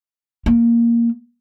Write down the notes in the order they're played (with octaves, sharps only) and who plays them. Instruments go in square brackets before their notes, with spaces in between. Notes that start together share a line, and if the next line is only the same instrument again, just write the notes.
[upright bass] A#3